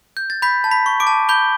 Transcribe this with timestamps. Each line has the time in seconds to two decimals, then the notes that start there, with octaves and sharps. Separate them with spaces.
0.17 G6
0.30 A6
0.42 B5 G6 B6
0.64 A5
0.71 B5 B6
0.86 C#6
1.00 D6 D7
1.07 A5
1.29 B5 G6 G7